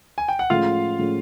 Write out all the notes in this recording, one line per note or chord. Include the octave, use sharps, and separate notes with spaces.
G#5
G5
F#5
A2 F3 G#3 C#4 F4 F5
A2 F3 G#3 C#4